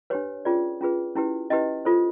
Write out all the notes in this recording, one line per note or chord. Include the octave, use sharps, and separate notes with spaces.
D4 G4 B4 C#5
C#4 F4 G#4 B4 D5
C#4 F4 G#4 B4
C#4 E4 G4 B4
C#4 E4 G4 B4 D#5
F4 A4 C5